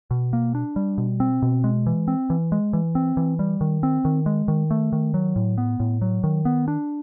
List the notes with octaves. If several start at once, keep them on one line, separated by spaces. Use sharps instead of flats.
B2
A#3
D4
G3
B2
C4
B2
G#3
E3
C4
E3
G#3
E3
C4
E3
G3
D#3
C4
D#3
G#3
D#3
A3
D#3
F#3
A2
B3
A2
F#3
D#3
B3
D4